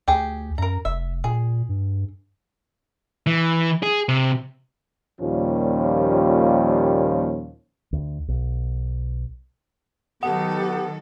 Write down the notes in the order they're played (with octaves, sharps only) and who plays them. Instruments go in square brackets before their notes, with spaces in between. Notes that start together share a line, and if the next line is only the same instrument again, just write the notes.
[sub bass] D2 [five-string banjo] G4 G#4
[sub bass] F#2 [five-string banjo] A#4 A#5
[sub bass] F1 [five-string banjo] E5
[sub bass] A#2 [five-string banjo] G#4
[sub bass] G2
[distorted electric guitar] E3
G#4
C3
[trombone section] D#2 A#2 F3 G3 C#4
[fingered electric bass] D2
B1
[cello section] D#3 F#3 A4 [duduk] B3 [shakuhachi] G4 [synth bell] F#5